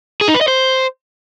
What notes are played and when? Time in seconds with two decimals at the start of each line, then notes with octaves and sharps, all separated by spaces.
0.21 G#4
0.28 D#4
0.35 B4
0.41 D#5
0.48 C5